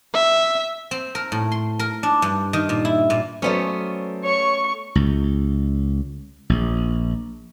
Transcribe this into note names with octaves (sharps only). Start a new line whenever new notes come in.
E5
C4
A#4
A2
C6
A#4
D4
G2
D#3
A#2
E4
A#2
F#3 A3 B3 C#4 C5 D5
C#5 C#6
C#2
A#1